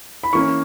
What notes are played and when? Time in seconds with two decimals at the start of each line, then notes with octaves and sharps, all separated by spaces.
0.24 B5
0.33 E3 A#3 C#4 C#6